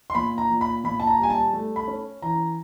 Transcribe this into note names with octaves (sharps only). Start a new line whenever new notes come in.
C6
A#2 B5
A#5
A#2
B5
A#2 B5
A5
A#5
G3 G#5
A5
A3
B5
C#4
E3 A#5